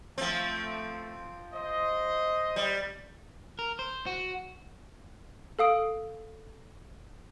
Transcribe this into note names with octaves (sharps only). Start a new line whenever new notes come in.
F3 A3 C4
C5 D#5
G3
A#4
C5
F#4
A4 F5 D#6 D7